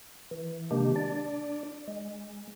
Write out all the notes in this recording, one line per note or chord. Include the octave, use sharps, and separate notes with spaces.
E3
C3 D#3 G#3 A#3 D4 G4
D4 D5
G#3